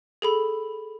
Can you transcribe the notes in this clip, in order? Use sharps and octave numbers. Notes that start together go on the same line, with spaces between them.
G#4 A4 B5